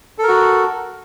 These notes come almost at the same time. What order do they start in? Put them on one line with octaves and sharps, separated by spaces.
A4 A#4 F#4